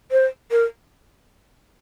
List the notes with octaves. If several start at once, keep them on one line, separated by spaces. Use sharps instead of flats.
C5
A#4